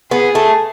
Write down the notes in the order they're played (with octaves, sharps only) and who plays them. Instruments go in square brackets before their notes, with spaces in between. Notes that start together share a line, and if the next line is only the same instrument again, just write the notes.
[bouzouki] B3 [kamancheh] G#4
[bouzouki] A3